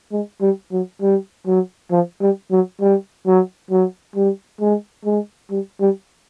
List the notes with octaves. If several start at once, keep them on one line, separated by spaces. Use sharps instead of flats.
G#3
G3
F#3
G3
F#3
F3
G3
F#3
G3
F#3
F#3
G3
G#3
G#3
G3
G3